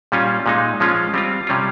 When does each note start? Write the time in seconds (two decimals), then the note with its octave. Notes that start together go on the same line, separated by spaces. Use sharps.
0.12 A#2 G3 C#4 F4
0.46 A#2 G#3 D#4
0.80 F3 G#3 C#4 F4
1.14 G3 C4 F4
1.47 C3 G3 C#4 F4